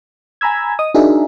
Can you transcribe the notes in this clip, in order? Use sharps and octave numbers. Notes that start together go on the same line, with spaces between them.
G#5 A#5 B5 E6 G#6
D#5 D#6
D4 D#4 F#4 G#4 A#4 E5